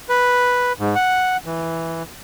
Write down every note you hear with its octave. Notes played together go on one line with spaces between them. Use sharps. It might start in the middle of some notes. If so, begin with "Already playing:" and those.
B4
G#2
F#5
E3